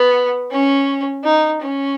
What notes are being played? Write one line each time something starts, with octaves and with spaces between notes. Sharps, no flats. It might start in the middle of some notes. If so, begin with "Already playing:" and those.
Already playing: B3
C#4
D#4
C#4